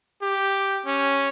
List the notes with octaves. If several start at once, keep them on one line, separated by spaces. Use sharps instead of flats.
G4
C#4